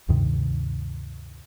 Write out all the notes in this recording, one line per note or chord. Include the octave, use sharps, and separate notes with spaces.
D2 G2 C3 D#3